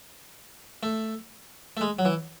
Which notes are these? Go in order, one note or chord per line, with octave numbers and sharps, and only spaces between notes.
A3
A3
G#3
F#3
E3